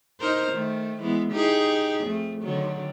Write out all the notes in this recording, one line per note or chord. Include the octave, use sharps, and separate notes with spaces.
D#4 A#4 C5
D#3 A3
E3 G#3 B3
D#4 G4 G#4
F2 A3
D3 D#3 F#3